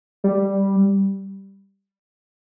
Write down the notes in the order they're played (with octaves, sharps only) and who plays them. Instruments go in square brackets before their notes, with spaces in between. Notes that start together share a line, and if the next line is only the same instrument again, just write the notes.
[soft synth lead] G3